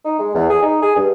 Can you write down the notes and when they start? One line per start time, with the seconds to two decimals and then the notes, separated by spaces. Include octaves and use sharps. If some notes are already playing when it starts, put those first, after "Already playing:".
0.05 D#4
0.19 G#3
0.35 E2
0.50 G#4
0.63 D#4
0.82 G#4
0.96 G2